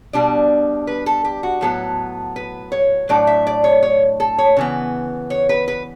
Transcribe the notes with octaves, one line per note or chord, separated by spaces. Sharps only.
B2 G3 D4 D5
B4
A4
G4
F#4
A2 F#3 B3 A4
B4
C#5
A2 F#3 A3 D4 D5
E5
D5
C#5
C#5
A4
C#5
C#3 E3 B3
C#5
B4
B4